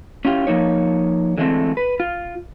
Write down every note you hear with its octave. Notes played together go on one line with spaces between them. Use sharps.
C#4 E4 F4 G4
F3 A#3 D#4 C#5
D3 E3 G#3 A3 C4
B4
F4